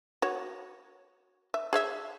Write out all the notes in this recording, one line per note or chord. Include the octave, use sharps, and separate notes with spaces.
F#4 C#5
E5
G#4 C#5 E5